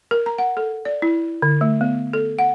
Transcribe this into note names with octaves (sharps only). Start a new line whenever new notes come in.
A#4
A#5
F#5
A4
D5
E4
D3
A3
B3
A4
F#5